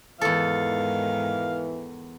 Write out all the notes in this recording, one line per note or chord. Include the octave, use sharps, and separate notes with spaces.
E2 G#2 D#3 E3 A4 F5